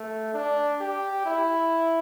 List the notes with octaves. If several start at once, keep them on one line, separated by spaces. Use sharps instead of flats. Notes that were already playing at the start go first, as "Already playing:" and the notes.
Already playing: A3
D4
G4
E4